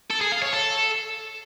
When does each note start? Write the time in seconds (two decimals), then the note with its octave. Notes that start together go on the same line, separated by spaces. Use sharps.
0.11 A4
0.21 G#4
0.32 F5
0.42 C#5
0.53 A4